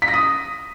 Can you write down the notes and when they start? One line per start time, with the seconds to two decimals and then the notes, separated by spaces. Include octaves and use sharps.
0.02 B6
0.08 A#6
0.14 D#6